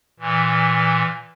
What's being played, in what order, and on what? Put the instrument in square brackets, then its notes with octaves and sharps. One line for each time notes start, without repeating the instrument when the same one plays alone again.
[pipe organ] A#2 E3